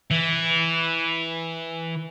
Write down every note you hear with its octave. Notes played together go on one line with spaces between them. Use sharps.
E3